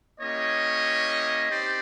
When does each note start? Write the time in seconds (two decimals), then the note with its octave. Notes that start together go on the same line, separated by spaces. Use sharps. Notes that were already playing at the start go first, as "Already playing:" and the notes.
0.20 A#3 C#4 E4 G4 C#5 D#5
1.50 C4 D#4 G4 C5 D5